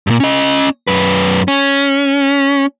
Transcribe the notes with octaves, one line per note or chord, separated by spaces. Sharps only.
G2 A#2
C#4 D#5
F#2 B4
C#4